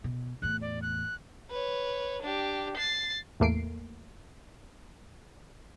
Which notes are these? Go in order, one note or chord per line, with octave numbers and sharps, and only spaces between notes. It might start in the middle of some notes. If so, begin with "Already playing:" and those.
B2
E2 A2 F#6
D5
F#6
B4 C#5
D4 G4
A6 C7
A1 E2 A3 A#3 C7 D7